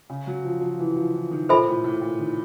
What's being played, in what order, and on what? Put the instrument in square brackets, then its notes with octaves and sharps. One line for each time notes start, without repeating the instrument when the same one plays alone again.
[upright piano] C#3
F#3
F3
F3
E3
F3
E3
D#3
[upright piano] A#2 [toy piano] A4 C5 E5 G#5 B5
[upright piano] A2
A2
A#2
D#3